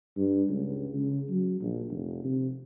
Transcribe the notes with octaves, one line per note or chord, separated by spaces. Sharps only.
G2
C#2
C#3
F#3
A#1
F1
C3